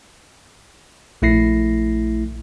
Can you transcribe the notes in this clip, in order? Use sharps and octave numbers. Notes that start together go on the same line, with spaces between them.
A#1 A3 E4 A#6 C7